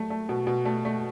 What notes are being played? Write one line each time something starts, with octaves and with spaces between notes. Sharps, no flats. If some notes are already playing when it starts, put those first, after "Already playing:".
Already playing: F#3 A3
A3
B2
B2
A3
A3